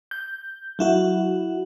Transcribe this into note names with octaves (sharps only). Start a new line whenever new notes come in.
G6
F#3 E4 F#4